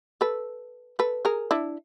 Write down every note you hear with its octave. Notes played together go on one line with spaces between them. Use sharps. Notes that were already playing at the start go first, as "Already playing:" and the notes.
A4 B4
A4 B4
G#4 A#4
D4 E4